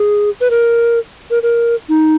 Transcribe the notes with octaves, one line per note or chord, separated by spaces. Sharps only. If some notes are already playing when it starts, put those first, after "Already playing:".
Already playing: G#4
B4
A#4
A#4
A#4
D#4